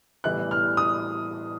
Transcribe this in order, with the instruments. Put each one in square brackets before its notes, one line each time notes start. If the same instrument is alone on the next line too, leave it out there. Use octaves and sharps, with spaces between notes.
[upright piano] A2 E3 G3 B3 E4 F#6
F6
D#6